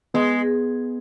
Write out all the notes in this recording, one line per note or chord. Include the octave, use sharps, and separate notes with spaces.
G#3 B3